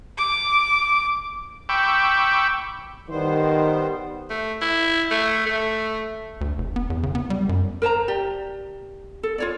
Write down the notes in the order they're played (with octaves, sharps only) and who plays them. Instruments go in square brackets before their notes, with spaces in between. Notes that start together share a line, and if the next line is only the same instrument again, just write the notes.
[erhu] D6
[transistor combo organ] G5 B5 C#6 D6 E6
[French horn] D#3 [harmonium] G3 B3 C5
[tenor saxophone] A3
E4
A3
A3
[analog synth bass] D2
F1
B3
E2
C#3
B3
G3
F#2
[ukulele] A#4 C5 A5 A#5
G4 D5
A4
F4 C#5 D5